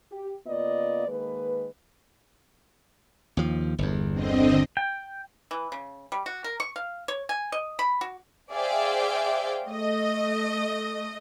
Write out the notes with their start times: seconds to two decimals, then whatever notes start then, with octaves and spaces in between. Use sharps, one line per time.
0.12 G4
0.47 C#3 A#3 B3 F4 D5 D#5
1.08 D#3 G#3 A#3 B4
3.37 D#2 F3
3.79 G1 E2
4.11 D3 C4 D#5
4.77 G5
5.51 E3
5.72 C#3
6.12 G3
6.26 F#4
6.44 A#4
6.60 C#6
6.76 F5
7.08 C#5
7.29 G#5
7.52 D#5
7.79 B5
8.01 F#4
8.53 G#4 C5 D5 E5 F5 G5
9.67 A3 D#5